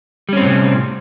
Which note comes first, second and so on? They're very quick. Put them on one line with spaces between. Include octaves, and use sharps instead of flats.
G3 C#4 C4 A2 C3